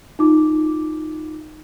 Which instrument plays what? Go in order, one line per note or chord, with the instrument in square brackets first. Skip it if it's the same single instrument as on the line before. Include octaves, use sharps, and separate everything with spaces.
[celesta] D#4 F4 D6